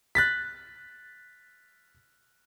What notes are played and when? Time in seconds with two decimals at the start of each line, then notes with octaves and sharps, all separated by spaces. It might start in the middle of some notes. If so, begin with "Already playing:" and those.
0.15 F#6 A6 B6